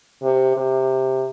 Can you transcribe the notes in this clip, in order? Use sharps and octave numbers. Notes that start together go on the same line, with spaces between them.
C3
C3